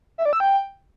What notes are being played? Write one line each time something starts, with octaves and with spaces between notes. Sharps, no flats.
E5
D5
E6
G5